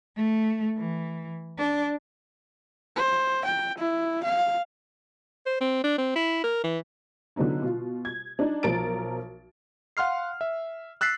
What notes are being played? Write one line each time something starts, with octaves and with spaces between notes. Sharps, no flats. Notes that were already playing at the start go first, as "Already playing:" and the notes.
A3
E3
D4
C5
G5
E4
F5
C5
C4
D4
C4
E4
A#4
E3
D3 F#3 B3 D#4 E4
B2 F4
G#6
D4 D#4
B1 F3 A#4 A6 D7
F5 F#5 C6 F6 C7
E5
E6 F#6 A6 B6 C7